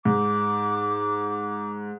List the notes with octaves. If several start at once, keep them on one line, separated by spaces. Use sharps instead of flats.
G#2 D6